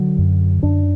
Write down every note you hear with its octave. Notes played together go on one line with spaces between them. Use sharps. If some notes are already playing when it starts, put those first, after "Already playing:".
Already playing: D3 F#3
F#2
F#2 D4